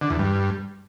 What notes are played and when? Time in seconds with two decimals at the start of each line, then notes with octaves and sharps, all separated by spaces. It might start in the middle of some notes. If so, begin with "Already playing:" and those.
0.01 D3
0.10 E2
0.19 G2